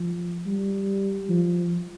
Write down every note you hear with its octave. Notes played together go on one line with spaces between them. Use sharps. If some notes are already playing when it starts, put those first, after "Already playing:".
Already playing: F3
G3
F3